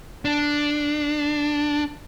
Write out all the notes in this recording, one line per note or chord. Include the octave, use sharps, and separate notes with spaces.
D4